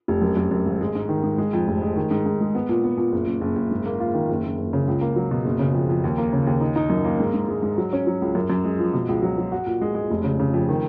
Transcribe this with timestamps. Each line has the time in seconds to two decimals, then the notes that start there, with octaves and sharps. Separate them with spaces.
0.08 F1
0.22 F#2
0.37 F#2
0.51 F#2
0.66 G#1
0.81 G#3
0.95 G#2
1.09 D#3
1.23 G#2
1.38 G#3
1.53 F2
1.68 F1
1.82 G#3
1.96 D#3
2.11 G#2
2.26 G#2
2.41 G#3
2.55 B3
2.69 A#2
2.84 B3
2.98 A#2
3.12 F#1
3.27 F#1
3.41 F#1
3.56 F#1
3.71 G#2
3.86 A#3
4.00 F4
4.14 D#3
4.29 F#1
4.44 F#1
4.58 F#1
4.73 C#3
4.88 C#2
5.01 A#3
5.16 F#3
5.31 B2
5.45 F#1
5.59 C#3
5.74 F2
5.89 F2
6.04 D#2
6.18 A#3
6.33 C#3
6.47 D#2
6.61 D#4
6.76 D#4
6.90 F#2
7.05 A#3
7.20 G#2
7.34 G#2
7.48 G#3
7.63 G#2
7.78 F#3
7.93 C#4
8.07 F#3
8.22 C#2
8.35 F#2
8.50 F#2
8.64 G#3
8.79 F3
8.94 B2
9.09 C#2
9.22 F#3
9.38 F#3
9.52 F#4
9.66 A#2
9.82 G#3
9.95 G#3
10.11 F1
10.24 C#3
10.39 C#3
10.54 F2
10.69 D#3